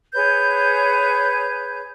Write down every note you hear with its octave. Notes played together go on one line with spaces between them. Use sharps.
G#4 B4 C#5 G6